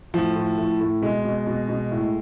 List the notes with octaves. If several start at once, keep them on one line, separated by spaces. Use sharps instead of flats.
A2 F3
A2
A2
A2
B2 G#3
B2
B2
B2
A2